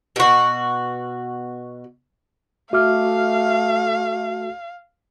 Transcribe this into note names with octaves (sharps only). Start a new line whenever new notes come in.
B2 F#4
A3 F#4 E5 F5 D6 F6